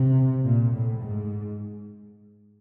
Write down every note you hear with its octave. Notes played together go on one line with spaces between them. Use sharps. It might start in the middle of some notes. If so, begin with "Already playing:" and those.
Already playing: C3
A#2
A2
G#2